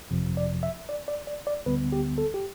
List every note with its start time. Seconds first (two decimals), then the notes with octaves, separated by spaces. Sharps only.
0.11 G1 F2 C3 F3
0.37 D5
0.63 E5
0.89 D5
1.08 D5
1.27 D5
1.47 D5
1.66 D2 D3 G3 B3 B4
1.92 G4
2.18 A4
2.34 G4